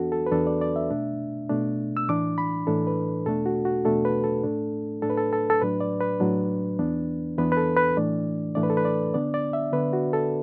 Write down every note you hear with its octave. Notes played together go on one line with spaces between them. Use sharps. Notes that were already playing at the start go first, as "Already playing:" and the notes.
Already playing: E2 E3 B3 D4 F#4 A4
A4
B4
E2 E3 B3 D4 A4
D5
D5
E5
B2 A3 D4
B2 A3 D4
E6
A2 E3 D4 D6
B5
A2 E3 D4 A4
B4
E2 B2 A3 D4 A4
F#4
F#4
E2 B2 A3 D4 A4
B4
A4
A2 A3 D4
A2 A3 D4 A4
B4
A4
A4
A4
A2 F#3 D4 B4
D5
B4
A2 F#3 D4
E2 E3 B3 D4
E2 E3 B3 D4 B4
B4
A4
B4
A2 E3 A3 D4 D5
A2 E3 A3 D4 D5
B4
A4
B4
D5
D3 B3 D4 D5
D5
E5
D3 B3 D4 B4
F#4
A4